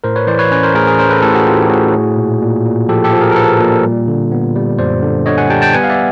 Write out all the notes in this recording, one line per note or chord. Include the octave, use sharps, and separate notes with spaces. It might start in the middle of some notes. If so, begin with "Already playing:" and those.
A2 A#4 C5
B4 C#5
E3 C5 D5
B4 C#5
C#4 B4 C#5
A#4 C5
A2 G#4 A#4
G#4 A#4
C#4 A#4 C5
A4 B4
A2 G4 A4
F#4 G#4
A2 F4 G4
G4
A2 F#4 G#4
A3
A#2
A#2
A#2
F3 G4 A4
G4 A4
F3
G#4 A#4
A#4
F3 A4 B4
A#2
G3
D3
B3
G3
F#2 C5 D5
D3
D3 C#5 D#5
F#5 G#5
G3 G5 A5
G5 A5
B3 F#5 G#5
F5
D5 E5